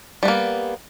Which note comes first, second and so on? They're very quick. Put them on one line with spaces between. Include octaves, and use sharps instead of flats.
G3 B3 A#3